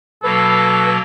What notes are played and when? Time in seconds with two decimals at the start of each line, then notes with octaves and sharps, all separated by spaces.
0.23 B2 F#3 A#3 A4 B4